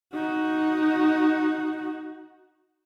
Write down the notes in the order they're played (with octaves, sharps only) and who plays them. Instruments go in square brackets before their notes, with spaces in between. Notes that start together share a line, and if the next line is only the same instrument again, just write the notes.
[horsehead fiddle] D#4 F#4